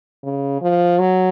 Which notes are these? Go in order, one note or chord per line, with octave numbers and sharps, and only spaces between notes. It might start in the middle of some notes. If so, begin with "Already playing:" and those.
C#3
F3
F#3